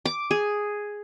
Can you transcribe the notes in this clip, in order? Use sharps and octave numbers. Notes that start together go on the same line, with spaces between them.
D6
G#4